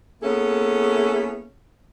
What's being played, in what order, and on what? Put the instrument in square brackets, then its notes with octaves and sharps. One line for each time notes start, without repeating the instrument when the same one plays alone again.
[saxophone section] A#3 B3 C#4 E4 G#4 A4